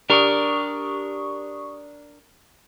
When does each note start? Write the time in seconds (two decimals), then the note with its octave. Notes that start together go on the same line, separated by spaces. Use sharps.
0.10 D4 G4 A#4 C#6 D#6